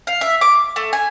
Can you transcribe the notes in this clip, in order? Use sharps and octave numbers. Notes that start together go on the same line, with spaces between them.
F5
E5
D6
A3
G#5